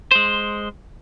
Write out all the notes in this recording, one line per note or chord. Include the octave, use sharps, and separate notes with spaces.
G#3 C5